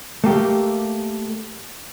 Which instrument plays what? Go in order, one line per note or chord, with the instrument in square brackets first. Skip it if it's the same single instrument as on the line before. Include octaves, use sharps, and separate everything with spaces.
[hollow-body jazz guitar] A3 A#3 G4